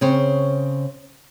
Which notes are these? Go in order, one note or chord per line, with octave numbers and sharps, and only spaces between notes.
C#3 C4 C#5